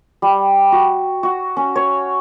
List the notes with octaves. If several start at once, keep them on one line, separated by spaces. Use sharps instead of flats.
G3
F#4
F#4
C#4
C#5